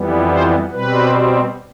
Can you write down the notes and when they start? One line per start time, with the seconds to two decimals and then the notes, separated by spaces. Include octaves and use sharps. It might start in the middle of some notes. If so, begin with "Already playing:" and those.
Already playing: F2 E3 G3 B3
0.30 C5
0.72 B2 G3 C4 B4